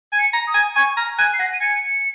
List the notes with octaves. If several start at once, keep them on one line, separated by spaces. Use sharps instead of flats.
G#5
C#7
A#5
D#6
G#5
G#5 C#6
A#5 F6
G#5 F#6
C7
F#5 A#6
D#7
G#5 C#7